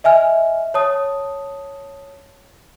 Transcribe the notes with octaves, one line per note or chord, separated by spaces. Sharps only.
D#5 E5 G#5 F6
C#5 A5 D#6